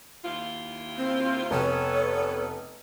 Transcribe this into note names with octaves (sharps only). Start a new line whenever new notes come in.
D#2 E4 F4
C4
F1 B3 A4 C#5